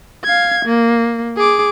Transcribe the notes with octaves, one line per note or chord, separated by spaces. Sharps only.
F5 G#6
A#3
G#4 D6